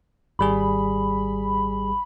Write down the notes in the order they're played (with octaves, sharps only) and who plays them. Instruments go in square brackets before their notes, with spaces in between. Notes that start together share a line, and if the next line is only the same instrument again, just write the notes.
[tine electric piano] G#1 G3 G#4 [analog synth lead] B5